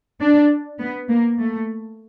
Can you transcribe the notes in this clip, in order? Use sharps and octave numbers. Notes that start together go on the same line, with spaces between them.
D4
B3
A#3
A3